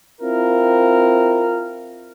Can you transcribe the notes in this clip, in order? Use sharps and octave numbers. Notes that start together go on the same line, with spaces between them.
C4 E4 F4 A#4